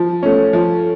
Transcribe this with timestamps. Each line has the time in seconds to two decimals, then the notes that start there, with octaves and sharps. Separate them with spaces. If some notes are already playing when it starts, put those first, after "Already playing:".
Already playing: F3
0.23 A3 C#4
0.53 F3